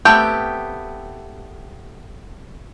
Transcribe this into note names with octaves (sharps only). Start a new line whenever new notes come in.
A3 B3 C4 G4